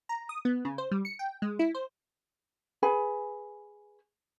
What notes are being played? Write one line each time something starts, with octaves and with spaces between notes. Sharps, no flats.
A#5
D#6
B3
C#3
C5
G3
C#7
G5
G#3
E4
C5
G#4 B4 G#5 B5